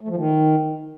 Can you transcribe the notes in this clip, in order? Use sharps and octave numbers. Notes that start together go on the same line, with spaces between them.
A3
F3
D#3